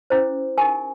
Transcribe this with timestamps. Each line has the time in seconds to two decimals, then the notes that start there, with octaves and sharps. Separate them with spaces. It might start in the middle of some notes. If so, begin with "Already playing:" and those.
0.10 C#4 E4 G#4 C5
0.58 D#4 G4 A#4 G#5